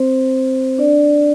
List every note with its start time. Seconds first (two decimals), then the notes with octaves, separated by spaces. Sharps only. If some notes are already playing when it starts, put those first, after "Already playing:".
Already playing: C4 C5
0.78 D4 D5